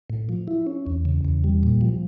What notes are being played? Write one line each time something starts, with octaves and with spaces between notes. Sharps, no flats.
A2
F3
E4
C#4
E2
C#3
E2
G3
A#2
F3